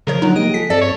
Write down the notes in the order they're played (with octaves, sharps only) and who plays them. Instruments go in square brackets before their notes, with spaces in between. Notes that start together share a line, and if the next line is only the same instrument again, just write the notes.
[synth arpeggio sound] C#3 F3 C#5 [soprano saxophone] A#4
[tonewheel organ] D3 F3 F#5 [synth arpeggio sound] F#3 D#4
[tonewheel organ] G#3 A#3 G4 [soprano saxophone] D#5 [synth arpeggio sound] D7
[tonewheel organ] F3 G#4 A4 [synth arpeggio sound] B6
[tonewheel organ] G2 C4 [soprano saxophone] A4 [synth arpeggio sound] D5
[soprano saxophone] C#5